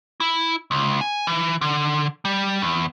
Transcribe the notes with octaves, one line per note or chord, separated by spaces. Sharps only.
E4
C#2
G#5
E3
D3
G3
E2